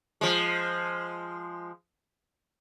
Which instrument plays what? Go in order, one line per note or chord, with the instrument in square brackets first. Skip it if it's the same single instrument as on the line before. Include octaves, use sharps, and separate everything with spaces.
[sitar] F3 G#3